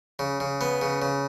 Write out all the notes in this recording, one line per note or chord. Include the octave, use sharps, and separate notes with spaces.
C#3
C#3
B3
C#3
C#3